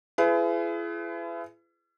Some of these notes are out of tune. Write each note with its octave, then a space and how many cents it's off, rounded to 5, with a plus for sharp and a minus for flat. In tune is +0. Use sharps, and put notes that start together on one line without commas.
E4 +45 G#4 +30 B4 +35